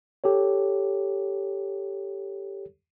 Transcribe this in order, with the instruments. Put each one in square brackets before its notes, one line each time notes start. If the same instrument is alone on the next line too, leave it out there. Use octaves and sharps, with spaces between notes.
[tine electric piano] G4 A4 C#5